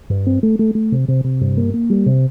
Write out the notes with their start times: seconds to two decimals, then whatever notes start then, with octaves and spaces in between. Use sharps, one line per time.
0.10 G2
0.26 C4
0.43 A3
0.59 A3
0.75 A3
0.92 C3
1.08 C3
1.24 C3
1.41 G2
1.57 A#3
1.74 A#3
1.90 G3
2.06 C3